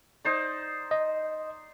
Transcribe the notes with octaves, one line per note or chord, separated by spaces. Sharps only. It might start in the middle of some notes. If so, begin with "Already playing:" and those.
D#4 C5 D5
D#5